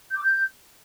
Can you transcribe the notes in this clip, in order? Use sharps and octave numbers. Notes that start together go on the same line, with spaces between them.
G6
D6
G6